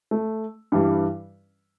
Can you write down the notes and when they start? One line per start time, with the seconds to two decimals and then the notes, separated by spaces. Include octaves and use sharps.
0.11 A3
0.72 G2 E3 G3